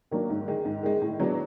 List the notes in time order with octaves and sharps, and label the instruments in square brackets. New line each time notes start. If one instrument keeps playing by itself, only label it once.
[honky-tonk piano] D#3 F#3 A#3 D4
G#2
D#3 G#3
G#2
D#3 G#3
A2
F#3 B3 D4